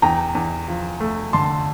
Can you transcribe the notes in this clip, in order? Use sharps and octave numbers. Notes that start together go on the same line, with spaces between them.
E2 G5 A#5
E2
F3
A3
D3 A5 C6